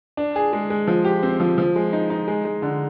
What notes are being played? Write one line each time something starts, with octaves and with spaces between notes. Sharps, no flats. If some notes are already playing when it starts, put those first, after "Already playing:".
D4
G#4
G#3
G#3
F3
G4
C4
F3
F3
G#3
D#4
D#4
G#3
G#3
D3